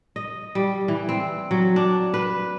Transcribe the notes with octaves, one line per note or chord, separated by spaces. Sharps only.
D#5
G3
E3
C4
F#3
D4
B4